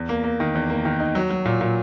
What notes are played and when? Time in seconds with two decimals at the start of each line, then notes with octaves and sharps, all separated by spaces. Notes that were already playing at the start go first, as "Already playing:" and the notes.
Already playing: E2
0.09 A#3
0.24 A#3
0.40 D#3
0.55 E2
0.70 A#3
0.85 D#3
1.00 D#4
1.15 F#3
1.30 F#3
1.45 A#2
1.61 A#2